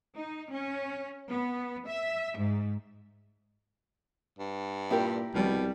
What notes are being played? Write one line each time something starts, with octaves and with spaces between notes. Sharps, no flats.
D#4
C#4
B3
E5
G#2
G2
A#2 E4 G4 A#4
C2 B2 G3